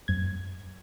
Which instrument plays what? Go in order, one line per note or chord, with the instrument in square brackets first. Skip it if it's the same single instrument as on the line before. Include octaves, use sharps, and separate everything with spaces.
[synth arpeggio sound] F#2 G#6